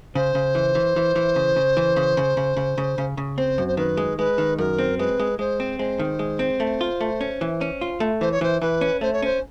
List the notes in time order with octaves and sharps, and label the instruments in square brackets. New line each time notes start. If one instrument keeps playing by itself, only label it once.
[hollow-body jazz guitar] C#3 [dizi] C5
[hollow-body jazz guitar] C#3
E3
E3
E3
E3
C#3
C#3
E3
C#3
C#3
C#3
C#3
C#3
C#3
C#3
[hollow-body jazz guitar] C4 [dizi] C5
[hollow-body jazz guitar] F#2
[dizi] C5
[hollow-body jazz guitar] D#3 [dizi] B4
[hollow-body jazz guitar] G#3
[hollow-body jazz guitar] G#3 [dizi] B4
[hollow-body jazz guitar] D#3
[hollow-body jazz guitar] F#2 [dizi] A#4
[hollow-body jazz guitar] C4
[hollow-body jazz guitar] G#3 [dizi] B4
[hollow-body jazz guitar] G#3
[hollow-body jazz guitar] G#3 [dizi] C5
[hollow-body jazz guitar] C4
[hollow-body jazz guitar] G#3 [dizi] C5
[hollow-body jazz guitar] D#3
G#3
C4
A3
F4
A3
C#4
E3
C#4
F4
A3
[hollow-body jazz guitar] E3 [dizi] C5
[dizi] C#5
[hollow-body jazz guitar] E3 [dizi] C5
[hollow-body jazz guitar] E3 [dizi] B4
[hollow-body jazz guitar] C#4
[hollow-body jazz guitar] A3 [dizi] C5
[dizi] C#5
[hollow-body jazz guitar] C#4 [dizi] C5